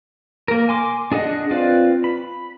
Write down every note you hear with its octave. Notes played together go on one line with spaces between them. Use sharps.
A#3 A#4
G#5 C6 D6
D4 G#4 D#5 F#5
C4 F4 B4 D5 F5
B5